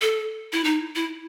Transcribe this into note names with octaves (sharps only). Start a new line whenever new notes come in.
A4
E4
D#4
E4